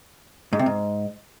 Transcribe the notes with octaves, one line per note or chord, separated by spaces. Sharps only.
G#2
C3
G#2